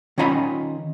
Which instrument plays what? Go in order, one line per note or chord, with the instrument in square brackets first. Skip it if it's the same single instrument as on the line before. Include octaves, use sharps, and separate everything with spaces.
[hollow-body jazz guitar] D#3 C#4 F4 D#5 A#5 B5